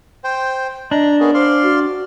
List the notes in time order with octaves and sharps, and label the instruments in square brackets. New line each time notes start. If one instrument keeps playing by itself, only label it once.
[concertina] C5 G5
[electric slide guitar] D4 [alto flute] D#5 [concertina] A#5
[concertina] B3 C#4 G#4 [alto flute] A#4
[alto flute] C5 [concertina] D5 F5 C6
[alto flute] F#4